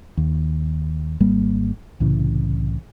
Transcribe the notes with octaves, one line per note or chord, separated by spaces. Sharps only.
D#2
G#1 G3 A#3
C2 A2 C#3 E3